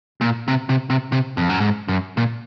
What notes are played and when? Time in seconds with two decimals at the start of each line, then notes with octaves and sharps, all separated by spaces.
0.21 A#2
0.48 C3
0.69 C3
0.90 C3
1.12 C3
1.37 F2
1.49 F#2
1.60 G#2
1.88 F#2
2.17 A#2